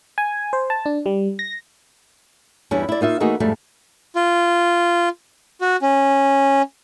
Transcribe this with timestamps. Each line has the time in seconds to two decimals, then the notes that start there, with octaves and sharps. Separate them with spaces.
0.18 G#5
0.53 C5
0.70 A5
0.86 D4
1.06 G3
1.39 A#6
2.71 E2 G2 G3 C#4 D4 E4
2.89 E4 D5
3.01 A#3 D#4 F4 E5
3.20 E3 A3 A#3 D#4 F#4 G#4
3.40 F2 G#2 G3 A3
4.16 F4
5.61 F#4
5.82 C#4